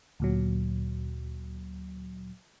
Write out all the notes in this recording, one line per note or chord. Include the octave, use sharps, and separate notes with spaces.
D2 A#2 F#3